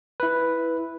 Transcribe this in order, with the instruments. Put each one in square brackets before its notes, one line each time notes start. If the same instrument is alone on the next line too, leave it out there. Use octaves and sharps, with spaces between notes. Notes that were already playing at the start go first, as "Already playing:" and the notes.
[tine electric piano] E4 B4